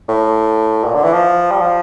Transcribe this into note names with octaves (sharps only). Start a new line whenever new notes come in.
A2
A#2
D3
E3
F3
G3
F3